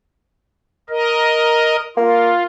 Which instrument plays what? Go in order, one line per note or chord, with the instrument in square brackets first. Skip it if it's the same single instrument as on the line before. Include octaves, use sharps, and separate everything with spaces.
[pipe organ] A#4 D#5
[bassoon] A#3 [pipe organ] F4